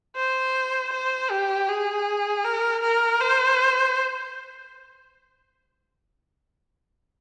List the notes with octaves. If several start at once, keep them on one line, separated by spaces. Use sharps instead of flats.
C5
C5
G4
G#4
A#4
A#4
C5